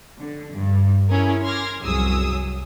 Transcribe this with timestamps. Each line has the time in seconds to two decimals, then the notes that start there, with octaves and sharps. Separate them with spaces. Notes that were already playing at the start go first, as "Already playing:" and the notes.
0.20 D3
0.54 G2
1.08 C#4 E4 G#4 A#4
1.45 C6 D6 F6 G#6 A#6
1.81 C2 F#2 F#3 G#4 D#6 E6